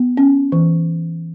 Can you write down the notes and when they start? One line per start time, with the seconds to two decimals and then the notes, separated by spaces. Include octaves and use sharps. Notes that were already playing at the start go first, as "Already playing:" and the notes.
Already playing: B3
0.17 C#4
0.52 E3